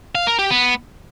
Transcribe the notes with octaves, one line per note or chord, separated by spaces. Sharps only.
F5
A#4
G4
B3